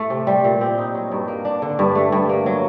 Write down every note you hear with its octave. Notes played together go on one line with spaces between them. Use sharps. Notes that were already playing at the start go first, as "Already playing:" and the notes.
Already playing: A2 A3
C3
G3
A#2
C4
D#4
F#3
G2
A#3
D4
D3
G2
A3
G2
A#3
F#3